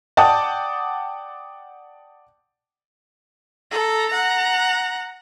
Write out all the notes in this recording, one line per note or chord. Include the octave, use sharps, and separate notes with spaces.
D5 F#5 G5 A5 D6 D#6
A4 A#5
F#5 A#5